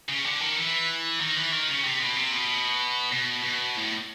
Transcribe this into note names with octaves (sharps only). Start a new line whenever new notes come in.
C#3
D3
D#3
E3
D#3
E3
D#3
C#3
C3
B2
C3
B2
B2
B2
A2